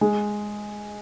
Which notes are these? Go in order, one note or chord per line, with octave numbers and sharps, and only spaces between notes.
G#3